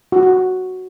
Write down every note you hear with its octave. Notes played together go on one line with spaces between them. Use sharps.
F#4
F#4
F#4